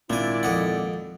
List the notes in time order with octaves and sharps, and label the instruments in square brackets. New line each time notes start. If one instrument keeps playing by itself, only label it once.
[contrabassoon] G#1 [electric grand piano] A#2 [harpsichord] D4 G#5 [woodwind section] E4 D5
[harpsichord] F2 D#5 F#5